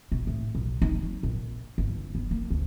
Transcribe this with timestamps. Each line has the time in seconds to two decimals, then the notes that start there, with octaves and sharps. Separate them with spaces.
0.12 B2
0.27 A2
0.55 B1
0.82 D#4
1.03 F#3
1.23 A#1
1.78 G1
2.15 B3
2.31 A#3
2.50 D2